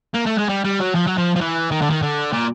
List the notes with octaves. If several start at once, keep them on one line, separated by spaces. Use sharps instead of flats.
A#3
A3
G#3
G3
G3
F#3
F3
F#3
F3
F3
E3
D#3
D3
D#3
D3
A#2